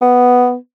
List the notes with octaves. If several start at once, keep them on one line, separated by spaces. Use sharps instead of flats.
B3